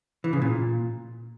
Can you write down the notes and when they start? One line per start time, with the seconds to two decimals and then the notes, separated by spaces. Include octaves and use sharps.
0.24 E3
0.33 C#3
0.42 A#2